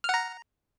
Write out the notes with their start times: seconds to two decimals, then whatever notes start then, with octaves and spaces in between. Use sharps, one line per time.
0.04 F6
0.09 F#5
0.14 A#5